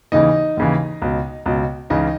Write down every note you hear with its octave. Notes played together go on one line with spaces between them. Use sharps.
D#2 C#3 E3 D#4 D#5
D#2 C#3 E3
C#2 B2
C#2 B2
C#2 C#3 E3 D#4 D#5